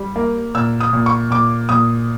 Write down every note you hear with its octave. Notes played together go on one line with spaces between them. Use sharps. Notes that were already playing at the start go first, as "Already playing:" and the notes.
Already playing: G3
A#3
A#2 E6
D#6
A#2
C#6
A#2 D6
A#2 D#6